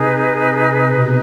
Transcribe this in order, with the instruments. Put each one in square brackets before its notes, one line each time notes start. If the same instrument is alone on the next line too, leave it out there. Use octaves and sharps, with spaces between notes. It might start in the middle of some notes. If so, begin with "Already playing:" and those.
Already playing: [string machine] C3 [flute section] D#4 G#4 B4
[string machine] B2